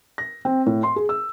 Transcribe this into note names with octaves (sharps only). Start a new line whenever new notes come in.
A#6
C4
A2
C6
G#4
E6